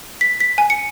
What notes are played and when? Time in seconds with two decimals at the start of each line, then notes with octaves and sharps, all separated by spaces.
0.21 B6
0.40 B6
0.58 G#5
0.70 C#7